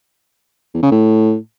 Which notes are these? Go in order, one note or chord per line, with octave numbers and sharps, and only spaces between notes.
E2
C#3
A2